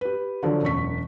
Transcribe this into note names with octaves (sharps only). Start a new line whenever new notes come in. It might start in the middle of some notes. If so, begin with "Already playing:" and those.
G4 B4
D3 F3 F#3
E1 F#2 C#6 B6